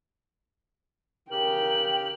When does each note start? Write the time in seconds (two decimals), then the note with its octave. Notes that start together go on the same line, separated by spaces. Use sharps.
1.31 C#3 G4 A#4 G5 F6 F#7